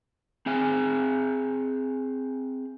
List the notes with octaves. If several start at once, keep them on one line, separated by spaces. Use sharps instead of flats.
C4 G#4 G#5